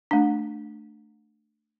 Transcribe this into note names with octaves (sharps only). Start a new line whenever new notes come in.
A3 D4